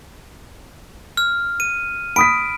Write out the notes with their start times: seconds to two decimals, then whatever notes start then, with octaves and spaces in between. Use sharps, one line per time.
1.17 F6
1.60 D#7
2.16 B5 D#6 B6 D7